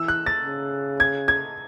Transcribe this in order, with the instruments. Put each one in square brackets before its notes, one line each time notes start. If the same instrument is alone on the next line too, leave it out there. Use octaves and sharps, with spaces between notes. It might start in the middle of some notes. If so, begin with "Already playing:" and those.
Already playing: [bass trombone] E3 [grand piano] E6
[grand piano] F#6
A6
[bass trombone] C#3
[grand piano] G#6
G#6